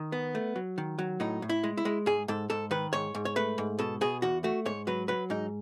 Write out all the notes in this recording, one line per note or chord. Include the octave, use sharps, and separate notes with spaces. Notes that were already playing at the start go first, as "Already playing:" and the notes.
Already playing: D#3
B3
A3
F#3
D#3
F#3
A2 D#4
A2
E4
G#3
E4
G#3
G#2 G#4
G#2 A4
G#2 A4
D#3 B4
G#2 C#5
G#2
C#5
A3 B4
G#2
B2 A4
B2 G#4
E2 F#4
A3 F#4
G#2 C#5
F#3 B4
F#3 B4
G#2 D#4